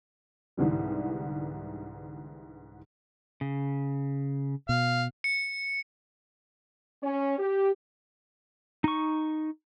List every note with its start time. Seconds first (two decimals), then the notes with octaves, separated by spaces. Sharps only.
0.57 C2 G#2 D3 E3 G3
3.41 C#3
4.69 B2 F5
5.24 C#7
7.03 C#4
7.39 G4
8.84 D#4 C#6